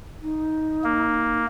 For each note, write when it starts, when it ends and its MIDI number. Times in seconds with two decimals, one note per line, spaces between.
0.22 1.40 63
0.84 1.46 58